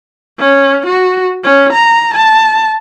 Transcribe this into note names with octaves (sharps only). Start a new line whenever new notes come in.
C#4
F#4
C#4
A#5
A5